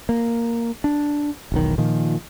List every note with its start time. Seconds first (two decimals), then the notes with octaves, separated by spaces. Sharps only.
0.09 A#3
0.84 D4
1.52 E1 B1 D#3
1.78 A#2 D#3 F3